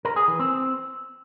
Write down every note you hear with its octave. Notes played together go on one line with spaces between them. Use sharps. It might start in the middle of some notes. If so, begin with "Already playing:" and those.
A#4
G#4
E3
C4